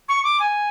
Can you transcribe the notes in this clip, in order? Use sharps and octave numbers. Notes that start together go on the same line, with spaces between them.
C#6
D6
G#5